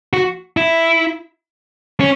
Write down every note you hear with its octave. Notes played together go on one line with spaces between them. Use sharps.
F#4
E4
C#4